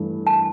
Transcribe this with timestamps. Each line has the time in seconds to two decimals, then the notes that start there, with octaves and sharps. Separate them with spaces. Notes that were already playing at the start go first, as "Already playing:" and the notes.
Already playing: G2 E3 A3
0.27 A5